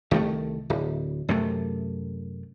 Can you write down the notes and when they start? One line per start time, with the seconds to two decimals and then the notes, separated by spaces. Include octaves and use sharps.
0.11 C2 D#3 F#3 A3
0.70 D1
1.29 F#2 C3 A3